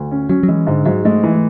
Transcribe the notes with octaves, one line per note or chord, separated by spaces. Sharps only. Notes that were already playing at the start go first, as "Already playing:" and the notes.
Already playing: D2
C#4
F#3 C#4
F#3
E3 G#3
G#2 D3
G#2 F#3
G#3 A3
E3